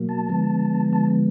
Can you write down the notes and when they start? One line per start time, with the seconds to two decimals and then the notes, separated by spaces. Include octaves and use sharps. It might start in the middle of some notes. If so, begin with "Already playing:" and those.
Already playing: B2 F#3 A#3
0.09 A5
0.29 D3 F3 G#3 B3
0.93 A5